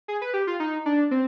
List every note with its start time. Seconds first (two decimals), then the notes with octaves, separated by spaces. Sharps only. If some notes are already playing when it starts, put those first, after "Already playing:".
0.08 G#4
0.22 B4
0.34 G4
0.47 F4
0.60 D#4
0.86 D4
1.11 C4